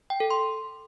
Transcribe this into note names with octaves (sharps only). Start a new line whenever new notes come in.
G5
A4
C6